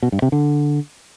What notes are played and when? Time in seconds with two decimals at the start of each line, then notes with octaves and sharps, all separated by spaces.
0.03 B2
0.12 G2
0.22 C3
0.32 D3